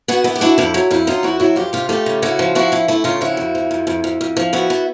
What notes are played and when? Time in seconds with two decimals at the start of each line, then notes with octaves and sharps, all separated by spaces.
0.08 B3 F#4 G#4
0.24 B3 E4
0.36 G4
0.41 D4 E4 F#4
0.58 F2 E4
0.74 F#3 E4
0.91 F2 E4
1.07 F#3 D#4 F4
1.23 F2 E4 F#4
1.40 F#3 E4 F#4
1.56 F2 F4 G4
1.73 C3 F4 G4
1.89 A3 F4 G4
2.06 C#3
2.22 C#3 E4 F#4
2.39 F3
2.55 F3 E4 F#4
2.72 A3 E4
2.88 A3 E4
3.04 C#3 D#4 F4
3.21 F3 E4 F#4
3.37 F2
3.55 F3
3.71 F2
3.87 F2
4.04 F2
4.21 F2
4.37 F3
4.53 B3 E4 F#4
4.70 B3